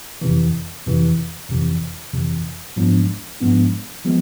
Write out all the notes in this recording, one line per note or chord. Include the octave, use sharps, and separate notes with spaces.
F2 C3 E3
F2 C3 E3
F2 C3 E3
F2 C3 E3
G#2 F3 G#3 B3 D4
G#2 F3 G#3 B3 D4
F3 G#3 B3